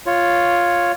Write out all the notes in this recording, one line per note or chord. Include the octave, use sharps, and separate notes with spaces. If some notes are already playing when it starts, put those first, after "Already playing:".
F4 C#5